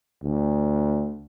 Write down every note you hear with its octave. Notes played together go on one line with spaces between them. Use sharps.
D2